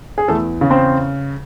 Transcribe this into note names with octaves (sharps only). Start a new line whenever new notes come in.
G#4
E2 A3 A4
C#3
C4 C5